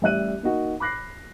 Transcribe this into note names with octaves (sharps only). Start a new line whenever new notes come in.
A1 G3 E5 F#6 D#7
A#3 D#4 F#4
B5 D6 F#6 A#6 C7